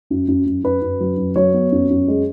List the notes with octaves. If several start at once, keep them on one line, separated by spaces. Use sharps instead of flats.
F#2
F#2
F#2
F#2 B4
F#2
F#3
F#2
F#3 C#5
B3
F#2
F#2
G#3